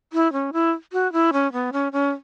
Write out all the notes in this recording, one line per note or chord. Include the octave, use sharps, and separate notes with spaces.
E4
C#4
E4
F#4
E4
C#4
B3
C#4
C#4